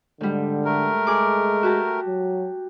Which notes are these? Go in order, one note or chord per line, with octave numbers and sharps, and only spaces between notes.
G#2 D3 G3
A3 A#4
G#3 G#4 D6
F#4 G4 A5
F#3